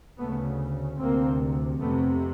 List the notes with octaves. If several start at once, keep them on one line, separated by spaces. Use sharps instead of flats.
D2 C#3 A3 B3
D2 C3 A#3 C4
F2 C3 A3 B3